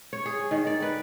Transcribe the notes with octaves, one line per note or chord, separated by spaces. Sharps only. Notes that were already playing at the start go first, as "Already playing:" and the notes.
C#5
G#4
D#3
D5
B4